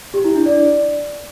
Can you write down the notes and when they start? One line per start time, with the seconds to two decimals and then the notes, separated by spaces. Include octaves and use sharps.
0.14 G4
0.25 E4
0.35 D4
0.46 D5